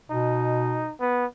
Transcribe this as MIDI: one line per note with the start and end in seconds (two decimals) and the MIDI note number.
0.10 0.88 47
0.10 0.93 63
1.00 1.25 59